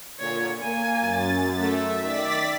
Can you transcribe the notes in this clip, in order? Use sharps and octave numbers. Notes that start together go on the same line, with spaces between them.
A#2 D3 C#5
A#3 G#5
F#2 A6
A3 E5
D#3 D5 A6 B6